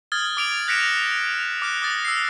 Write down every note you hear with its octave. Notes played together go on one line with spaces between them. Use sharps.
D#6 F6 G#6 A6 G7
D6 D7 F7
F#6 A#6 B6 C#7 D7 E7
D6 F6 F#6
D6 D#6 A6
E6 C7